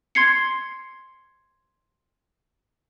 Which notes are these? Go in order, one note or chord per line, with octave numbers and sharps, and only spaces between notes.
C6 G#6 C7 C#7